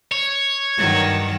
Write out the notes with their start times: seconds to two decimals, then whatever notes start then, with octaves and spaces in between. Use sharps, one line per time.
0.12 C#5
0.77 G2 D#3 F#3